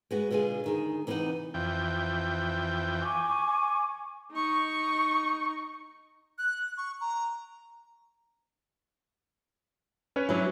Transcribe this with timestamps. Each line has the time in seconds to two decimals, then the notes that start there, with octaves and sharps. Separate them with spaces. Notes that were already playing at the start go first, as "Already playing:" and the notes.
0.11 G#3 B3 F#4
0.31 B2 D3 G#3 F4 G#4
0.64 D2 D#3 G#4
1.07 C3 E3 A#3 B3 D#4 F#5
1.54 F2 E3 G5
3.02 G#5 C#6 D6
4.32 D#4 C#6
6.38 F#6
6.77 C#6
7.01 A#5
10.16 C#4 B4 C#5
10.29 F#3 D4 E4